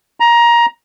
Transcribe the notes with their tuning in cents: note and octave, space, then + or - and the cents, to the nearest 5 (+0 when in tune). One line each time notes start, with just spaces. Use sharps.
A#5 +20